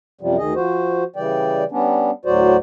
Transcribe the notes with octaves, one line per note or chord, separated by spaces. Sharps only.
F#2 C3 F3 G3
D2 D#3 G#4 D#5
F3 F#4 C5
C#3 E3 G3 D5 G5
G3 B3 C#4 D4
D2 A2 F#3 F#4 C5 D5